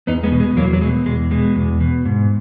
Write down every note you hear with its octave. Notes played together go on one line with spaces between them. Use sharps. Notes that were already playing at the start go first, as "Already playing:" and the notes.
E2 B3 D#4
G#3 B3
B2
G#3
E2 F#3 A#3
F#3
B2 G#3
E2 G#3
B2 G#3
E2
B2
G#2